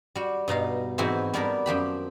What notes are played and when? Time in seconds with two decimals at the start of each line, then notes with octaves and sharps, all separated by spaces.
0.15 G3 F#4
0.48 G2 B2 D#4 F5
0.98 G#2 E3 C4 D#4 E4 F#4
1.34 G3 B3 D4 A#4
1.66 F#2 F3 G4 B5